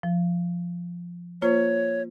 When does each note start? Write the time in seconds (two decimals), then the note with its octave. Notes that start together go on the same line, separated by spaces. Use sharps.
0.03 F3
1.42 A#3 F4 C5 C#5